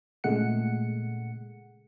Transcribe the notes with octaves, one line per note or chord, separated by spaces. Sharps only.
A#2 C#3 G#3 A3 F#5 C#7